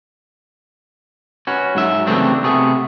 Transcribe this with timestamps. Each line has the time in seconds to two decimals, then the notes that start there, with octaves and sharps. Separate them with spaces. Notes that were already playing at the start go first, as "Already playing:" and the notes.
1.47 C#4 F#4 B4
1.75 G#2 F#3 E5
2.07 C#3 E3 G3 A3 C4 D4
2.44 C3 A3 B3 G#4